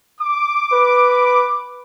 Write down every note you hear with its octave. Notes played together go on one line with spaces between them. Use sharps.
D6
B4